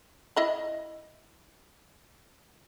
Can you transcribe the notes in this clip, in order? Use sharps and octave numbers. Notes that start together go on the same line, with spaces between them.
E4 D#5 B5